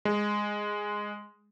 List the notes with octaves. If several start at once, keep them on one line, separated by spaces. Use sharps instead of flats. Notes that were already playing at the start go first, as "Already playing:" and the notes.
G#3